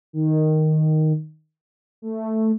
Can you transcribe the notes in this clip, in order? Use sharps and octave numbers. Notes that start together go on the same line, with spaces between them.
D#3
A3